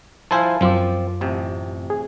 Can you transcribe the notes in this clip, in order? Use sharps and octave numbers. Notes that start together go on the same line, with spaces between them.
F3 E4 C5 F5 G#5 A5
F#2 F3 C4 F4 D6
A1 C3
G#4